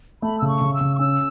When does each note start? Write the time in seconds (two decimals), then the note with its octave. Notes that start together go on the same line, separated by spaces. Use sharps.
0.22 A3 B5
0.39 C#3 E6
0.48 C#6
0.61 C#3
0.74 E6
0.80 C#3
0.96 C#6
0.99 C#4 E6